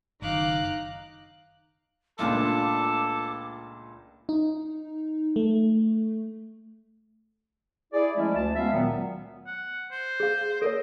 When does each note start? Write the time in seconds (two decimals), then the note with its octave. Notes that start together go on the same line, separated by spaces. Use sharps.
0.22 F#1 D#3 D#4 F5 D6 F#6
2.19 C#2 A#2 A3 D4 F4 A4 D6
4.29 D#4
5.36 A3
7.93 E4 G#4 D5
8.16 F3 G#3 A3 C#4 E4
8.35 D2 A5
8.55 G#3 A3 B3 C#4 E5 F5
8.73 A#2 D#3 F#3 B3
9.47 F#5
9.92 C5
10.20 G#4 F5
10.62 A4 A#4 C#5 D#5